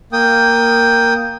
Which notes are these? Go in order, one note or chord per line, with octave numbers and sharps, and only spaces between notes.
A#3 G5 D#6